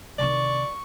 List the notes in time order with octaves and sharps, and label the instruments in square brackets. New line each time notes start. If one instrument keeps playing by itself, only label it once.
[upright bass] C3 D#3 [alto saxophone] D5 [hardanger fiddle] C#6